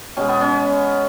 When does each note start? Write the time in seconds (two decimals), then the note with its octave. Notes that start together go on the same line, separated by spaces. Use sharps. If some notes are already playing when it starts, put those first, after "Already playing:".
0.17 B2 G#3 C#4
0.28 B3
0.41 C#4